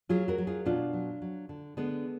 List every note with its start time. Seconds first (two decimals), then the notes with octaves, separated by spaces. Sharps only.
0.09 F#3 F4 G#4
0.28 F#4 A#4
0.38 F#3
0.47 F4 G#4
0.66 B2 D4 F4
0.93 F#3
1.22 F#3
1.49 D3
1.77 D3 G#3 B3